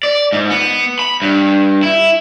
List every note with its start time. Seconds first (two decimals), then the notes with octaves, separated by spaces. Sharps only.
0.03 D5
0.33 G#2
0.50 B3
0.99 B5
1.22 G2
1.83 E4